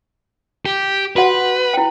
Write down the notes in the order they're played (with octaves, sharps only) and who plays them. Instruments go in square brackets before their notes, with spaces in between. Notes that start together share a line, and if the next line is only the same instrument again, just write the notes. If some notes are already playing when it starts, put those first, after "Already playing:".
[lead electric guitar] G4
[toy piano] F#4 F#5 [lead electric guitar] B4
[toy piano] E4 G5